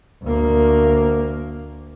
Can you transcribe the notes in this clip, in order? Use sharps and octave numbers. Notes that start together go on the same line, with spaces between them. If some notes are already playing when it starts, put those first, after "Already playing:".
D2 A#3